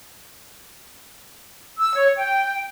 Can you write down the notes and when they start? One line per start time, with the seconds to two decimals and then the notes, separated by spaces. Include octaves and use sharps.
1.79 E6
1.94 C#5
2.16 G5